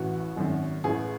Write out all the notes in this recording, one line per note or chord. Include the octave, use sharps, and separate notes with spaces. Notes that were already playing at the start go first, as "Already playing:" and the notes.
Already playing: A1 A2 E3 F#4
G#1 F#2 D#3
A1 A2 E3 G#4